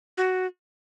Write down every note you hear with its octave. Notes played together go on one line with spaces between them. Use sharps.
F#4